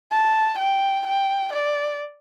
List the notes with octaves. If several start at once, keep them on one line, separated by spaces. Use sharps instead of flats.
A5
G5
G5
D5